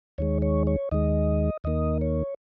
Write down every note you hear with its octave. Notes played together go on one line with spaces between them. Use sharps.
D#2 D#3 G#3 C#5
C#5
C#5
D#2 D#3 G#3 D#5
D#2 D#3 A#3 D#5
C#5